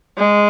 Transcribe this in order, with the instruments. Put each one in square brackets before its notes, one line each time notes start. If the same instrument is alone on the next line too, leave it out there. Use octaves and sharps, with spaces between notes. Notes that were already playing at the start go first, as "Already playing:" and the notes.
[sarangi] G#3